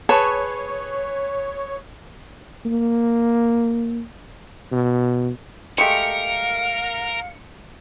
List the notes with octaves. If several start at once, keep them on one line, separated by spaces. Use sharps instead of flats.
G#4 B4 C#5 A5 C#6
A#3
B2
G#3 A3 G4 A#4 F5 C#7